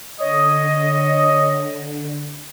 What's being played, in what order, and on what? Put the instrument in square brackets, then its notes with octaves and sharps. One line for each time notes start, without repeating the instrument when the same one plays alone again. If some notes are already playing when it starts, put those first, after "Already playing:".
[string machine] D3 [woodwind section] C#5 D#5